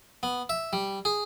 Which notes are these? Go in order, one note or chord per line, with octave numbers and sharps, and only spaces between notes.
B3
E5
G3
G#4